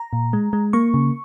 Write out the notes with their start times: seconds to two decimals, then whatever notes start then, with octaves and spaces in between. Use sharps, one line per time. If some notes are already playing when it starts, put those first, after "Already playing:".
Already playing: A#5
0.13 A#2
0.33 G#3
0.53 G#3
0.73 A#3 C#6
0.94 C#3